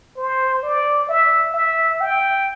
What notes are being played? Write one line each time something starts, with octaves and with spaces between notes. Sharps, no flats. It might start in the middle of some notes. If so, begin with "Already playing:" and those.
C5
D5
E5
E5
G5